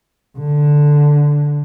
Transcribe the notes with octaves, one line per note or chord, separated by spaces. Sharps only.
D3